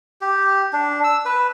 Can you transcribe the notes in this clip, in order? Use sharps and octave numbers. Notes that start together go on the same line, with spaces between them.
G4
D4
E6
B4